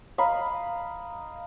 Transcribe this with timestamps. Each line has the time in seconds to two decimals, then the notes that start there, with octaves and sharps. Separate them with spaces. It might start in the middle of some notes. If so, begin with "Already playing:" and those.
0.18 D#5 F5 A#5 B5